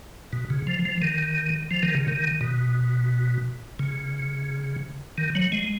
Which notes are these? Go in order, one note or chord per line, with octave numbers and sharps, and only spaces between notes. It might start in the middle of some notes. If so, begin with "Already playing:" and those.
B2
C#3
F3
F3
D#3
F3
D#3
C#3
D#3
B2
C#3
D#3
F#3
G#3